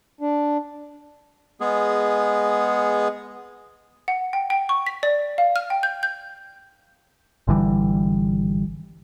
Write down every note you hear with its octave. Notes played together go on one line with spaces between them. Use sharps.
D4
G#3 B3 G#4
F#5
G5
G5
C#6
B6
D5
F5
F6
G5
G6
G6
G#1 D3 E3 G3